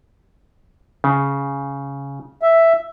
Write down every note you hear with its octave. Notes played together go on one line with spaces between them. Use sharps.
C#3
E5